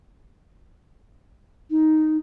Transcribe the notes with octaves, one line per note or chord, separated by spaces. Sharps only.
D#4